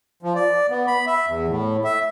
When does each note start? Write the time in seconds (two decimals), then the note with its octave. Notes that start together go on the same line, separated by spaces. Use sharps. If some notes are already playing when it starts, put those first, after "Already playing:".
0.23 F3
0.35 D5
0.70 B3
0.87 B5
1.06 E5
1.27 E2
1.48 A2
1.84 E5